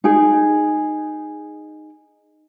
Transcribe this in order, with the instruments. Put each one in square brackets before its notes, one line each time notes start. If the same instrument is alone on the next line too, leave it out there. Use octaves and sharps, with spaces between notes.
[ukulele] D#4 G#4